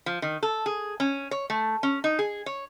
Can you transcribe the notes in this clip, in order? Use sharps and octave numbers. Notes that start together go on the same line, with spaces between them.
F3
D#3
A4
G#4
C#4
C#5
A3
C#4
D#4
G#4
C#5